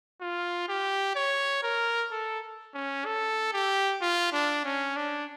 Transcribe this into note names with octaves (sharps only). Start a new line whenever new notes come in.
F4
G4
C#5
A#4
A4
C#4
A4
G4
F4
D4
C#4
D4